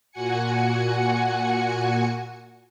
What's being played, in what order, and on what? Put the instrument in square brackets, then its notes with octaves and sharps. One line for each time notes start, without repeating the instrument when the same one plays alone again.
[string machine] A#2 F#4 F#5 G#5 C#7